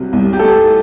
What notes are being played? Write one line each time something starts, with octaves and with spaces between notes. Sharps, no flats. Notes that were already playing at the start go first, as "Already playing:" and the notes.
Already playing: C2 C3 F#3
C2
G4
A3 A4